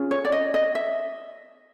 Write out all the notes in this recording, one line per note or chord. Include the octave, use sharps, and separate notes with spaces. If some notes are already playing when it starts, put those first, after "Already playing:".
Already playing: C#4 F4 G#4
C#5
D5
D#5
D#5
E5